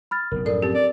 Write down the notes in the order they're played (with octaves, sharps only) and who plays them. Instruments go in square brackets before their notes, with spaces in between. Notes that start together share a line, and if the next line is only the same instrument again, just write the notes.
[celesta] B5 F6 A6
[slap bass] F#1 B1 B2 [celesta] A#4
[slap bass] F#2 A2 F3 [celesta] A4 A#4 [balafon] D5
[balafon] C4 G4
[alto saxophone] D5